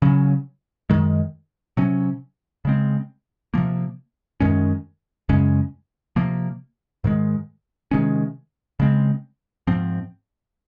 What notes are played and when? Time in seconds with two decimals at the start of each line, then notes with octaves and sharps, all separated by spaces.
0.02 C#3 F#3 C#4
0.90 F#2 D#3 G#3
1.77 C3 F#3 C#4
2.65 C#3 G#3 C4
3.54 C3 F3 A#3
4.40 F#2 D#3 G#3 C#4
5.29 F#2 C#3 G#3 C#4
6.16 C3 F3 A#3
7.04 G#2 D#3 G#3
7.91 C3 D#3 G#3 C#4
8.80 C#3 G#3 C4
9.67 G#2 F3 C4